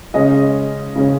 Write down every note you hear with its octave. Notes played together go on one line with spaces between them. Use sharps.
C#3 G#3 C#4 D#5
C#3 G#3 C#4